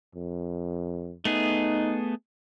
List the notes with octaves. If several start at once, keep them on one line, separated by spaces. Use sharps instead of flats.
F2
A3 B3 D#4 G#4